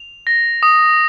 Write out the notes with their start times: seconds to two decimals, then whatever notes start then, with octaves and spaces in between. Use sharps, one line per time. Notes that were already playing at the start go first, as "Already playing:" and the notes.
Already playing: F7
0.27 A#6
0.63 D#6